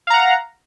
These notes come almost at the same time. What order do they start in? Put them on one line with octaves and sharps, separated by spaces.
F5 A#5 F#5